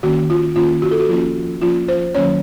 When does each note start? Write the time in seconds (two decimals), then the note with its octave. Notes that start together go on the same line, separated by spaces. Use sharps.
0.03 D#3 A#3 C#4 F#4
0.30 F4
0.56 D#3 A#3 C#4 F4
0.82 F#4
0.91 A4
1.00 F#4
1.09 F3 A#3 C#4 F4
1.62 F3 A#3 C#4 F4
1.88 C5
2.15 D#3 F#3 A#3 C#4 C#5